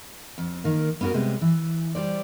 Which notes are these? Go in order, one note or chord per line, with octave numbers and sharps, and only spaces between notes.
F2
D#3 A#3
B3 C#4 F4 F#4 A#4
C3 G3 G#3 B3
E3
G3 C5 D5